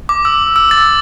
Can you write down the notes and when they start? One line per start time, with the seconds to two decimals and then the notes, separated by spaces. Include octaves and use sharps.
0.09 D6
0.25 E6
0.56 E6
0.71 A6